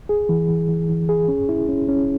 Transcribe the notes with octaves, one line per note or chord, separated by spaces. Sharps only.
G#4
E3
E3
E3
E3
G#4
C#4
E4
C#4
C#4